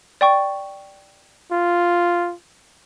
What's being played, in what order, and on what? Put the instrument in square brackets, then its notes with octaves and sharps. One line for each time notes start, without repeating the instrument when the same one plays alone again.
[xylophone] D5 G5 C#6
[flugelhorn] F4